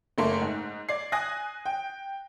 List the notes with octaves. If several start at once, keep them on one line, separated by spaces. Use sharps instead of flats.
F#1 A3 A#3 C6
G#2
D5 G#6 C7
G#5 D#6 F#6 G#6 A#6
G5